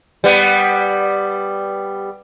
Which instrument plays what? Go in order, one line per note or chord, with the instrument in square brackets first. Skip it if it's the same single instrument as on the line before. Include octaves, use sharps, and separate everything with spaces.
[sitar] G3 B3